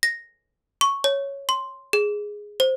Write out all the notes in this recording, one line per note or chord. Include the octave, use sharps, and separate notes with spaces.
A#6
C#6
C#5
C6
G#4
C5